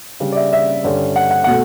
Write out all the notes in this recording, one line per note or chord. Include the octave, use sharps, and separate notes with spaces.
C#3 G3 D4
D5
E5
E5
G2 D3 G3 C#4
F#5
F#5
B2 A3 F#5